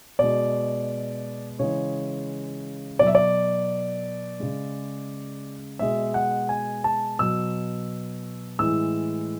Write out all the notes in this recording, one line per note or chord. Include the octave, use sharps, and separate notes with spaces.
B2 G#3 D5
C#3 E3 G#3 C#5
B2 F#3 D5 E5
D5
C#3 G#3
B2 G#3 E5
F#5
G#5
A5
B2 F#3 E6
A2 E3 G#3 E6